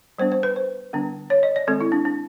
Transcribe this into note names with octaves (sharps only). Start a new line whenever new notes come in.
G3 B3 D4 C5
C5
B4
C5
D3 G3 B3 D4
C#5
D#5
D5
D#3 G#3 C4 A4
E4
D4
D4